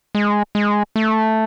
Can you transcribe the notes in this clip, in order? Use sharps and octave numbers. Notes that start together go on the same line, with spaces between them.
G#3
G#3
A3